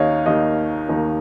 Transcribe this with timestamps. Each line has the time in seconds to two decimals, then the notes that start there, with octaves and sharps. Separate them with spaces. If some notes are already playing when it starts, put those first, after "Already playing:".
Already playing: D#2 D#3 A#3 D#4 C#5 D#5 F5
0.26 D#2 D#3 A#3 D#4 D#5
0.89 D#2 D#3 A#3 D#4